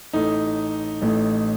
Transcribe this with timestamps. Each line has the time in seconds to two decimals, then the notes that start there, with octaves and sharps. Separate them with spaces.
0.13 A1 A2 A3 D#4
1.02 A1 A2 A3